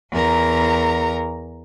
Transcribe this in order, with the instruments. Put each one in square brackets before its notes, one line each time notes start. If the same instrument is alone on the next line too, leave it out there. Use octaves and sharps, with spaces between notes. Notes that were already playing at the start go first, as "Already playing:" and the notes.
[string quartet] E2 A#4 A#5